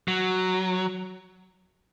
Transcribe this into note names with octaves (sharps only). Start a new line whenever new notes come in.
F#3